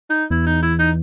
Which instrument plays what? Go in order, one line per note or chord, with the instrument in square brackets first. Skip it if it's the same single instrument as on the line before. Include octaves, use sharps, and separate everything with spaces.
[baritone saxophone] D#4
[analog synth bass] E2 [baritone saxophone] E4
[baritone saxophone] D#4
E4
D#4